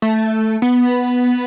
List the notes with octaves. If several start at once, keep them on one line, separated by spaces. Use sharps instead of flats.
A3
B3